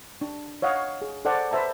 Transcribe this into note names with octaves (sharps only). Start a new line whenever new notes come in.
D4
C#5 D#5 F5 F#5
G#4
A4 C5 D5 F#5 A5
B4 C5 E5 A5 A#5